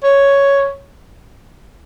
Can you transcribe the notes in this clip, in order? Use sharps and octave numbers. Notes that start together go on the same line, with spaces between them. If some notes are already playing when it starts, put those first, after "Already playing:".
C#5